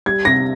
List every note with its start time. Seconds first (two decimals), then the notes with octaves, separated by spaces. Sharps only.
0.06 G3 G#6
0.25 C3 A#6